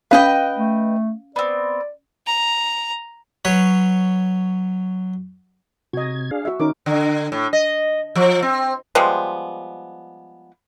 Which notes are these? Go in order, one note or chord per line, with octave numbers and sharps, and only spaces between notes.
C#4 B4 D#5 F5 G5
A3
B3 C4 D5
A#5
F#3 B4 C#5
C3 F#4 D#5 G#6
D4 G#4 F5
F#4 E5
D#3 C#4 D#4 A#4 D6
D3
A2
D#5
F3
C4
F3 G3 G#3 B3